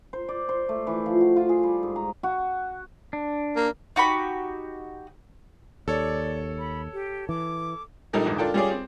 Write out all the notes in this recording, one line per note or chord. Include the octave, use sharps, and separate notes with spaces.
C5
D5
C5
A3
E3
F3
F#4
F4
G#4
G3
G#2
A#5
F#4
D4
A#3
D#4 F#4 G4 B5
D#2 A4 C#5 D5
B5
G4
E3 D6
A#1 A#2 G3 D#4 A4 A#4
E2 G#2 D3
D4 F4 A4 A#4 G5
G3 C#4 F4 G4 G#4 D5
C4